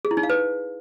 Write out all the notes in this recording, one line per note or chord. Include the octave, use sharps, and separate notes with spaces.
G#4
E4
D#4
F5
B4